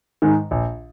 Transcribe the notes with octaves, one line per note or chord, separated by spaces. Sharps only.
G#2 D#3 G#3
A#1